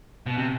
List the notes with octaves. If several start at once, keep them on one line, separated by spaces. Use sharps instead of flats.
B2
C3